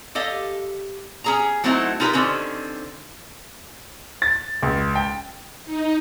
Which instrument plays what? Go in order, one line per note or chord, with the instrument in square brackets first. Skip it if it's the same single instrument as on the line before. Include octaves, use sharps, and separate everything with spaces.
[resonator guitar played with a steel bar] G4 A4 D#5 F5
C#4 G#4 A#5
F#3 A3 C4 D#4 E4 F#4
D#4 F4 G4 A#4 B4
D3 D#3 C4 C#4
[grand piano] A6
C#2
G5
[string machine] D#4